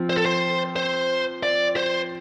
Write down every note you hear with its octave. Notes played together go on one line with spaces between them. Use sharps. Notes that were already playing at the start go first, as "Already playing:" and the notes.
Already playing: F3 C4
C5
A4
C5
C5
D5
C5